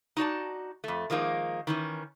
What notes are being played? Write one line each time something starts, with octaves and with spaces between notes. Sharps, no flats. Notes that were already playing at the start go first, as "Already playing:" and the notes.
D#4 F#4 D5 A5
F2 A3
D#3 F3 G#3 A#3
D#3 E3 C#4